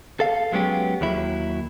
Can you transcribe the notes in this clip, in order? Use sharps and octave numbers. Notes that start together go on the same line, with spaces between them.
A4 F5
F#3 G#3 B3 C#4 G4
D#2 F#3 E4